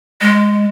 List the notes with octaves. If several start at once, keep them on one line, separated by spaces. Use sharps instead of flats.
G#3